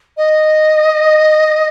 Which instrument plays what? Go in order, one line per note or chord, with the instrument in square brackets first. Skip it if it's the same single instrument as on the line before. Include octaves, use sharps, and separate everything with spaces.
[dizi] D#5